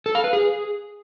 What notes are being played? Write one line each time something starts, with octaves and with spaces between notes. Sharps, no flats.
A4
F5
B4
G#4